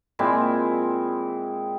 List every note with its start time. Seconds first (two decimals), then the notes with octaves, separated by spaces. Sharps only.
0.19 A#2 G#3 C4 E4